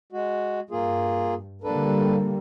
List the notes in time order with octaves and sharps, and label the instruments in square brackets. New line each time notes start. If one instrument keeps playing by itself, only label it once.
[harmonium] G#3 F#4
[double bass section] G2 [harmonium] A#3 F4 G#4
[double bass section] D3 G3 A#3 [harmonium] D4 A4 B4